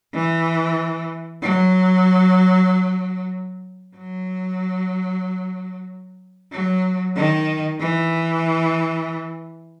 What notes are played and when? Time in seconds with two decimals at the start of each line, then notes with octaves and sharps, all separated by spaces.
0.14 E3
1.42 F#3
3.97 F#3
6.52 F#3
7.16 D#3
7.80 E3